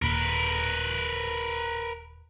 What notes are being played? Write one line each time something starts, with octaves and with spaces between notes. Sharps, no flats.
D#1 A#4 B4